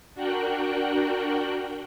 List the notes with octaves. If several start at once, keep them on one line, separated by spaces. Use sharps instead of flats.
D4 F#4 A#4 G5 F#6